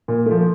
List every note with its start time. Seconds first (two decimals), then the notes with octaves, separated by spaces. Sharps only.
0.08 A#2
0.26 F3 A3